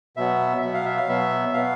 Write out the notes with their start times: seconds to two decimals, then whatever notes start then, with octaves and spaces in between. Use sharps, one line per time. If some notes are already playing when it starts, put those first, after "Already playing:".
0.17 B2 F#3 B3 E5
0.62 B2 F#3 B3 E5
0.74 F5
0.85 E5
0.97 F5
1.08 B2 F#3 B3 E5
1.54 B2 F#3 B3 F5